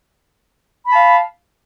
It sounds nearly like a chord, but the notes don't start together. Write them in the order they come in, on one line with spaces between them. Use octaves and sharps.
B5 A5 F5